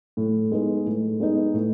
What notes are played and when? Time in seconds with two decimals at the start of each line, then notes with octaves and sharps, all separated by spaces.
0.17 A2
0.52 G#3 B3 D#4
0.86 A2
1.20 G#3 B3 D#4
1.54 A2